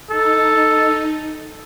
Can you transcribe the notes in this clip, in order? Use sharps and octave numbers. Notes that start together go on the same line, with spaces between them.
D#4 A4